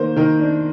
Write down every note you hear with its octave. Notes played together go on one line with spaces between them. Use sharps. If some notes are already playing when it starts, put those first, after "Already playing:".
Already playing: D#3 A#3 C5
D#3 A#4
D4